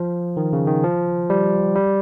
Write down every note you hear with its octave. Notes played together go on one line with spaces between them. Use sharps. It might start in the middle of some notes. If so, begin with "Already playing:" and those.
Already playing: F3
D#3
C#3
D#3
F3
G3
G3